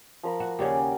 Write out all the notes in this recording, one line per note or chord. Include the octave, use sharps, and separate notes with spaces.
F3 A#4 B5
F#4
D#2 C#3 C#4 G4 D5 F#5